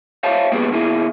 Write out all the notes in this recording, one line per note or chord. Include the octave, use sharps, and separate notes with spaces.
C5 C#5 E5 F5 G#5 A5
B2 F#3 G#3 A#3 B3 G4
B2 D#3 A#3 E4 G#4